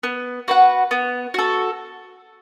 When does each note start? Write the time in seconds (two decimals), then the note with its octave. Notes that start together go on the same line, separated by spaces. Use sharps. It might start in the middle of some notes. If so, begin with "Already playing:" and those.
0.03 B3
0.48 F#4 B4 F#5
0.91 B3
1.34 F#4 A4